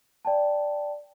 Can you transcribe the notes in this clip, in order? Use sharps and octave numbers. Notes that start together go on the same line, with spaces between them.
D5 G5 A5